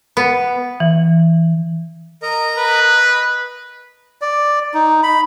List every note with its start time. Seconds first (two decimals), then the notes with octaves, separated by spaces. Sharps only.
0.17 B3
0.80 E3
2.22 A#4 D#5 A#5
2.58 B4
2.97 D#5
4.22 D5
4.74 D#4
5.03 B5